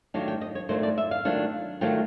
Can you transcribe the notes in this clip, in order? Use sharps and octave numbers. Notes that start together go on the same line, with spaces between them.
D#3 F#3 A3 D4 F4
G5
D#5
C#5
D#3 F#3 A3 D4 F4 C5
D5
E5
F5
D#3 F#3 A3 D4 F4
D#3 F#3 A3 D4 F4 G5